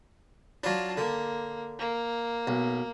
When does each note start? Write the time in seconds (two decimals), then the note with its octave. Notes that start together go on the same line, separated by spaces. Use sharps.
0.64 F#3 D4 F4 A5
0.97 D3 A#3
1.79 A#3
2.47 B1